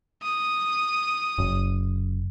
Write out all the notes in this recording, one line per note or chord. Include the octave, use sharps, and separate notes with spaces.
D#6
F#1